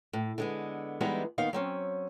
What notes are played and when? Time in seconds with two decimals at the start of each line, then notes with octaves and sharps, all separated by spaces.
0.13 A2
0.38 D3 G#3 B3
1.01 E3 G3 G#3 B3 D#4 E4
1.38 D#2 D#3 B3 F5
1.53 F#3 C4 C#4